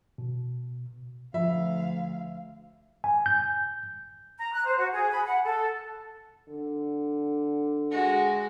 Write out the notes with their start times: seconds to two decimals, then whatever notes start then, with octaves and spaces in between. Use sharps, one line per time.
0.18 B2
1.34 D2 F3 E5 F5
3.04 G#5
3.26 G6
4.38 A#5
4.53 F#6
4.65 C5
4.77 F#4
4.92 G#4
5.11 B5
5.25 F#5
5.44 A4
6.49 D3
7.91 G#3 F#4